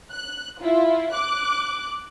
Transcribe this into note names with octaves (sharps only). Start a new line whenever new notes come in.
F#6
E4 F4
D6 F#6